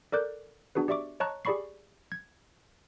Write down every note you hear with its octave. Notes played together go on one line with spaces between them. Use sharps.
A4 A#4 D5 D6 F#6 G6
B3 D4 F#4 G#4 B4
G4 D5 E5 C#6 D6
C#5 D#5 A5 A#5 C#6 F#6
G4 G#4 D5 B5 C#6 C7
G#6